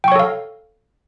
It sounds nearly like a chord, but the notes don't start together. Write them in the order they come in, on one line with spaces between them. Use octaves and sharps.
G5 C#6 C#5 A4 F5